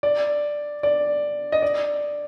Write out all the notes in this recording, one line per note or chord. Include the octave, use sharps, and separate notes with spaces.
D5
D5
D#5
D5